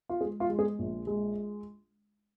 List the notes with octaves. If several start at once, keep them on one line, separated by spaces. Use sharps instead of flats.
F4
G#3 G#4
F4
G#3
G#4
A#1
G#3